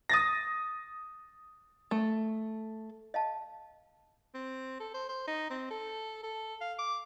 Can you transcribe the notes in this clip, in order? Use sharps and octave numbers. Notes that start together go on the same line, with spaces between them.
D#6 A6 A#6
A3
D#5 F5 A5
C4
A4
C5
C5
D#4
C4
A4
A4
F5
D6